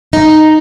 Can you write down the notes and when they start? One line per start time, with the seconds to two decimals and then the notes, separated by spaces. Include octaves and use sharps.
0.13 D#4